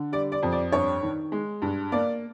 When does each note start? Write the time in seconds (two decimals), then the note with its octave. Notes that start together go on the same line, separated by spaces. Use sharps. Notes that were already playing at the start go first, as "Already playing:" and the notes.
Already playing: D3
0.12 G3 D5
0.32 D5
0.43 F2
0.52 D5
0.72 G2 C#5
1.03 D#3
1.32 G#3
1.62 G2
1.92 A#3 D5